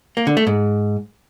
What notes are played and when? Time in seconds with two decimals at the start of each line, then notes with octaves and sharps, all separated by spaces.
0.17 A#3
0.27 D3
0.37 A3
0.47 G#2